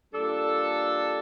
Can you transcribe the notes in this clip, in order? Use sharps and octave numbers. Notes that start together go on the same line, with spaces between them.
A#2 G3 D4 A4